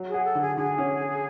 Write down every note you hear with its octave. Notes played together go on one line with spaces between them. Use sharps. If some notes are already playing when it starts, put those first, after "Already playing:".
Already playing: F#3
G#4
F#4
A4
D3
G#4
D3 G#4
C#4